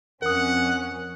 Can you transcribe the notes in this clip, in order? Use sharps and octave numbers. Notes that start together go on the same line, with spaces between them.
F2 C#4 A#4 F#5 D#6